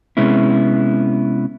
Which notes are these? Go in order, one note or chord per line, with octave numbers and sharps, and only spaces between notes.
C3 G#3 B3 C#4 E4